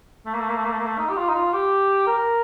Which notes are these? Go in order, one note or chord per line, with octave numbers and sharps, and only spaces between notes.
A3
A#3
A3
A#3
A3
A#3
A3
A#3
A3
D#4
G4
F4
D#4
F4
G4
A#4